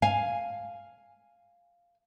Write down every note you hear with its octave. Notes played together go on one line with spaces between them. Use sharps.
F5 G#5